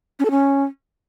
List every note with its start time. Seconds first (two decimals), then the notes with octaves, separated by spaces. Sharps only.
0.19 C#4
0.25 A4
0.31 C#4